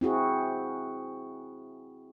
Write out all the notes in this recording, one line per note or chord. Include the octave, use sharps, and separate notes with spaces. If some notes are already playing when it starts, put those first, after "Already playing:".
C4 E4 F#4 G#4